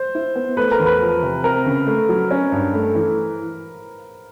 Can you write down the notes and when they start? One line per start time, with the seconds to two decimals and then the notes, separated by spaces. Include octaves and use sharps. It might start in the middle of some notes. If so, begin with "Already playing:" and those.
Already playing: C5
0.15 E4
0.35 B3
0.57 A3 B4
0.72 A#4
0.79 E2
0.86 B4
1.01 F3
1.23 C3
1.44 C4 A#4
1.66 C#3
1.87 A3
2.09 F#3
2.31 C#4
2.52 G2
2.74 A3
2.95 E3